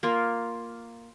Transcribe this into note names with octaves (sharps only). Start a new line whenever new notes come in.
A#3 F4 A#4